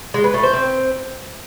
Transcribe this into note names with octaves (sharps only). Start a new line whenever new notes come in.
G#3
B4
A3
C5
C4